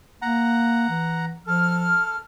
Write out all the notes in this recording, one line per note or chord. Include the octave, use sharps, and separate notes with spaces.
A#3 F#5 A#5
E3
F3 A4 F6